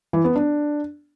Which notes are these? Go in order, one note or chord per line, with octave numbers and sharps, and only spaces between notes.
E3
B3
D4